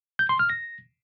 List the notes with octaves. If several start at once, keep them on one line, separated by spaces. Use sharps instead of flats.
G6
C6
F6
A#6